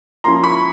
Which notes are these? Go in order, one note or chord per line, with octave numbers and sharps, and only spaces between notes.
F3 A#3 C#4 E4 A#5 C6
B5 C#6